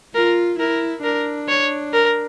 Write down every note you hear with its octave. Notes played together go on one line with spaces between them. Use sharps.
F4 A#4
E4 A#4
D4 A#4
C#5
A#4